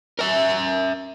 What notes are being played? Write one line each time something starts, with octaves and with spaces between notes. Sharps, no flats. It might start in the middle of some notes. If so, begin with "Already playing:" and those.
A#4 E5